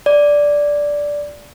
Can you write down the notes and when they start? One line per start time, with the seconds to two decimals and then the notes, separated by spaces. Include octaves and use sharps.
0.06 D5